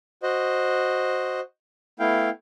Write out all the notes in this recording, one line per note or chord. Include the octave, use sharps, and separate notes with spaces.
F#4 C5 D#5
A3 B3 E4 F5 G5